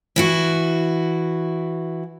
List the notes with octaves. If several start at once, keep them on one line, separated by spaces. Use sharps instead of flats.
E3 E4 F#4